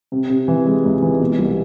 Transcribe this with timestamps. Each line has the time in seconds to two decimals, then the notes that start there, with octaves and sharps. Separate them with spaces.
0.12 C3
0.29 C3
0.48 E3
0.66 G#3
0.85 C#2
1.02 E3
1.20 B2
1.39 C2